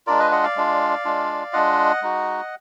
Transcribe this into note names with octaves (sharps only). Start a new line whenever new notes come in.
G#3 D4 F4 A#4 D5
B4 D#5
D#5 F#5
D5 F5
G#3 D4 F4
G#3 D4 F4
G#3 D4 F4 D#5 F#5
G#3 D#4 F#4